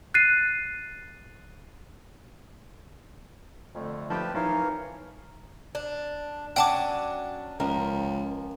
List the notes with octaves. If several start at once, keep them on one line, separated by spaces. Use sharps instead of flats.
F#6 A6 C7 D#7
F2 D3 A3
F3 G4 B4 G5 A5
E3 F3 D#4 A#4 C#5 F5
D4
F#3 C#4 D4 F#5 G5 A5 D6
C#2 F3 A#4